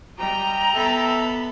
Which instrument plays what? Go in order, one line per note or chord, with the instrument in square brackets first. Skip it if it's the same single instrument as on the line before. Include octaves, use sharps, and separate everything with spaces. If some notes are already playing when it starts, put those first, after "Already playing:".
[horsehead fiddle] G3 [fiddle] D#5 G5 [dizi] A#5
[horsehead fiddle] B3 B5 [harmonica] A4 E5